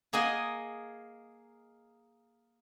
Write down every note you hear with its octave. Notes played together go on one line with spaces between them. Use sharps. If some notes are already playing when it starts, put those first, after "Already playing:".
A#3 G#4 D#5 F#5 G#5